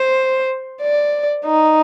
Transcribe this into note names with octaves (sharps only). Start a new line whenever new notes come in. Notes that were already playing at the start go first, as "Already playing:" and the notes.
Already playing: C5
D5
D#4